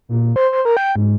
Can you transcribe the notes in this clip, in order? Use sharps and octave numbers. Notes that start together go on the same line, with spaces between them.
A#2
C5
C5
A#4
G5
G#2